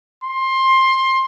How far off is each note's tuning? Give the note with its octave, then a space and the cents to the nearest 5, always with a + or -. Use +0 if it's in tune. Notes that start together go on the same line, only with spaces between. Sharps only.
C6 +20